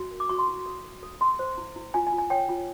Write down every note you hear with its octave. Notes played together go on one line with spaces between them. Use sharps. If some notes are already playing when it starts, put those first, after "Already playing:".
Already playing: F#4
A#4
D6
F#4 C#6
C6
E4
A4
A4
A4
A4 C6
C5
E4
E4
F4 G#5
G#5
F4
G#5
C#5 G5
F4